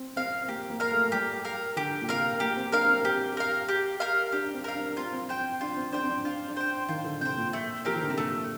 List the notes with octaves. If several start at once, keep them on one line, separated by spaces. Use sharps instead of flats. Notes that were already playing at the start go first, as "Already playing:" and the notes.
Already playing: C4
C4 A#4 F5
A#3 G4
A#3
A#4 F5
A3
G3 G4
A#4 F5
D3 G4
A#2
C3 A#4 F5
A#3 G4
C4
D4 A#4 F5
C4
C4 G4
A#4 F5
G4
A#4 F5
D4 G4
C4
A#4 F5
D4
C4 F4
C4
C4 C5 G5
D4 F4
C4
D4 C5 G5
C4
D4
D4 F4
D4
C5 G5
D#3 F4
D3
C3 C5 G5
A#2
A3
F3 C4 G4 A#4
D#3
D3
C3
A#2 A3